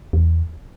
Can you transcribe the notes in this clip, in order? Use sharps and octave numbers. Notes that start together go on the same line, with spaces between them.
E2